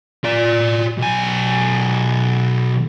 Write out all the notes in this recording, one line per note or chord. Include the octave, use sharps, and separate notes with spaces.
F4 D5
B1 G#5